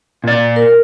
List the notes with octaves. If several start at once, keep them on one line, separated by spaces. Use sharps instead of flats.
A#2 D5
A#4